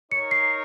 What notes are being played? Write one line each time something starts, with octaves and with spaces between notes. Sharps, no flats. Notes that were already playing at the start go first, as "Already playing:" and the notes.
D#4 A#4 C#5 C#7
C7